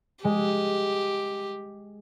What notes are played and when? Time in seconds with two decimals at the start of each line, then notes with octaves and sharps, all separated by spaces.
0.24 G#3 G4